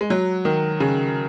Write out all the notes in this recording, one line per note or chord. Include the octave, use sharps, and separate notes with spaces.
G#3
F#3
D#3
C#3